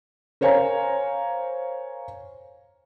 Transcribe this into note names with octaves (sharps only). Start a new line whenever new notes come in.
A#4 C5 C#5 F5 G#5 A#5